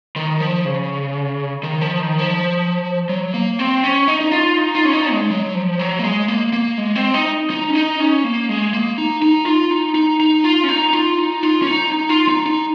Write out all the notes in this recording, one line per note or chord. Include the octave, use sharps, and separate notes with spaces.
D#3
F3
C#3
D#3
F3
D#3
F3
F#3
A#3
C4
C#4
D#4
D#4
F4
D#4
F4
C#4
D#4
G#3
F#3
F3
F#3
A#3
G#3
A#3
A#3
G#3
C4
D#4
D#4
C#4
D#4
C#4
A#3
G#3
A#3
D#4
D#4
F4
D#4
D#4
D#4
F4
C#4
D#4
F4
D#4
F4
C#4
D#4
D#4
F4
D#4
D#4